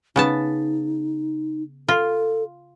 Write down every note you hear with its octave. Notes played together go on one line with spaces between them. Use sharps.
C#3 B3 D#4 A5
F4 A4